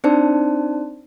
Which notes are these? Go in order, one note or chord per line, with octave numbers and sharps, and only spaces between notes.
C4 D4 D#4 C5 D5 A5